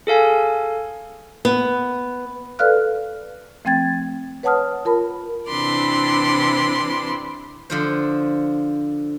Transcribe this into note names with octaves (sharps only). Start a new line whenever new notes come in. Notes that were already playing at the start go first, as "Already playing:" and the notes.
G#4 A4 F5 G#5
B3
A4 B4 D5 F5 F6 F#6
F3 A3 C4 G5 G#6 A6
B4 C#5 F#5 A5 D#6 F6
F4 A#4 A5 B5
C3 E3 D4 B5 C6 D6
D3 F3 C5